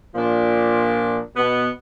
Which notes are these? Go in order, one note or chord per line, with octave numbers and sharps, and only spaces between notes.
A#2 F3 D4
B2 B3